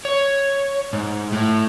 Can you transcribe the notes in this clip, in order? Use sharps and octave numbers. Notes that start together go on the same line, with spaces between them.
C#5
G#2
A2